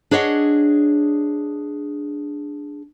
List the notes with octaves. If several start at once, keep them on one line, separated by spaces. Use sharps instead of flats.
D4 G#4 C#5 D#5 F#5